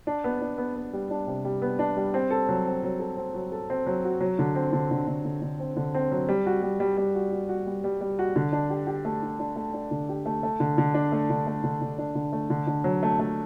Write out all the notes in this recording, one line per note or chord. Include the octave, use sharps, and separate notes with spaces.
D4
B3
D4
B3
B3
G3
D4
C3
G3
B3
D4
G3
C4
A4
F#3
C4
F#3
A4
C4
F#3
A4
C4
F#3
F#4
F#3
D3
C4
D3
D3
D3
D3
D3
C4
D3
C4
F#3
G3
F#4
G3
G3
G3
F#4
F#4
F#4
G3
G3
G3
F#4
D3
D4
G4
G4
A3
D4
D4
A3
D4
D3
G4
A3
A3
D3
D3
D4
A3
D3
A3
D3
D3
D4
D3
A3
D3
D3
F#3
A3
A3